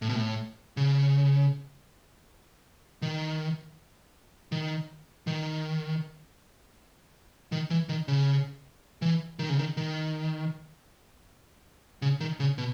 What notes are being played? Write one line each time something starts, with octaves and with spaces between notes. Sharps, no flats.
A2
B2
A2
C#3
D#3
D#3
D#3
D#3
E3
D#3
C#3
E3
D#3
C#3
D#3
D#3
C#3
D#3
C#3
B2